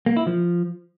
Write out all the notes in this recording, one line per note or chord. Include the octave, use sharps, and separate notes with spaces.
A#3
E4
F3